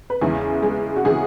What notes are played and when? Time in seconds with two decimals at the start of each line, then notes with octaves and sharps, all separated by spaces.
0.10 B4
0.21 E2 C#3 E3 G#3 G#4
0.63 G#3 G#4
0.96 F#4
1.05 C#3 E3 G#3 G#4